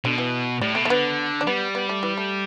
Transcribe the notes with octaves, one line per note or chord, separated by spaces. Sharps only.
B2 D3
E3
A2 G3
B2 A3
E3 A3
D3 B3
D4
G3 B3
B3
A3
E3
A3